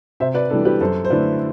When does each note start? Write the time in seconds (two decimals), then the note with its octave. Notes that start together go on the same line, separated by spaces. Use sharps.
0.20 C3 C5 E5
0.34 B4 D5
0.50 E3 G3 B3 D4 A4
0.65 G4 B4
0.81 F#2 A4 C5
1.05 C5
1.10 D3 A3 E4 B4 D5